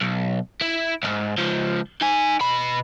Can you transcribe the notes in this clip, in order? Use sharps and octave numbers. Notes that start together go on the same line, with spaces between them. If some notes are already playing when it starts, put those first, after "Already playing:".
B1
E4
B1 G#2
C#2 F3
D#4 G#5
B2 B5